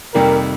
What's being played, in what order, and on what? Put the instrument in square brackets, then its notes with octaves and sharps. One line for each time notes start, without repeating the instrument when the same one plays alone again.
[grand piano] F2 C3 D#3 G3 A#3 [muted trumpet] A#4